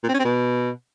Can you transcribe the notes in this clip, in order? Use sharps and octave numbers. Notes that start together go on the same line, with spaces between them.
A#2
C4
C#4
C4
B2